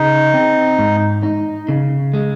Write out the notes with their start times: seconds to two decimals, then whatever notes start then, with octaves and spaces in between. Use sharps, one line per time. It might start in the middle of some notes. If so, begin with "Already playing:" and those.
Already playing: C#3 D#4
0.34 C4
0.79 G#2
1.23 D#4
1.69 C#3
2.14 G#3